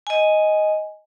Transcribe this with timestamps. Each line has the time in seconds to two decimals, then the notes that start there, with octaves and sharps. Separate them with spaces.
0.07 D#5 G#5